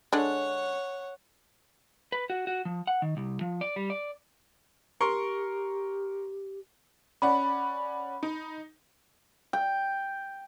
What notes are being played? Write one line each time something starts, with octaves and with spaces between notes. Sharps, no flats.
D3 G#3 D4 C#5 F#5
B4
F#4
F#4
F3
F#5
D#3
C2
F3
D5
G3
D5
G4 A#4 C6 C#6
C#4 D5 F#5 B5
D#4
G5